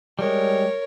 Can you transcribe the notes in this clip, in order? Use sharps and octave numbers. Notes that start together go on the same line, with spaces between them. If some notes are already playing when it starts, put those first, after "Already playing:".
G3 G#3 A#4 C#5